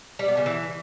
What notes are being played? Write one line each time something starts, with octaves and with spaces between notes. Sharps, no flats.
G3
B3
C#3
E3